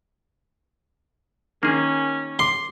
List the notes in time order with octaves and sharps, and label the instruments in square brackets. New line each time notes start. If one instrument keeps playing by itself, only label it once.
[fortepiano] D#3 [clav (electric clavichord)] A#3 G#4 [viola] C#4
[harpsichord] C6 [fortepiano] D6